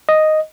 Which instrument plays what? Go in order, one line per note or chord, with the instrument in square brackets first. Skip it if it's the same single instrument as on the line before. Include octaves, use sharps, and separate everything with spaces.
[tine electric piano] D#5